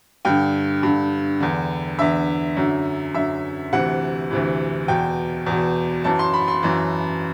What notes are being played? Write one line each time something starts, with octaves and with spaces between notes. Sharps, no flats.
G2 D3 G5
G2 D3
E2 D3
E2 D3 E5
F#2 D3
F#2 D3 E5
D2 C3 E3 F#5
D2 C3 E3
E2 B2 G5
E2 B2
F#2 E3 A5
C6
B5
C6
F#2 E3